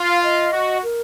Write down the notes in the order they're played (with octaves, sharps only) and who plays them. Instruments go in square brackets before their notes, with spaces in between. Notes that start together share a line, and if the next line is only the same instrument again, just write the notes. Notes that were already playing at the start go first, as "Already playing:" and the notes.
Already playing: [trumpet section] F4
[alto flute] F5
D#5
[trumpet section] F#4
[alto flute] A#4